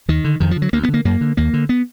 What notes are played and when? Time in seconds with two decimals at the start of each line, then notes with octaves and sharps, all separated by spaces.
0.08 D#2 D#3
0.24 D3
0.40 F2 D#3
0.51 F3
0.56 D3
0.62 F#3
0.73 D2 A#3
0.83 B3
0.88 D3
0.94 A#3
1.05 F#2 A#3
1.21 D3
1.37 D#2 A#3
1.53 D3
1.69 B3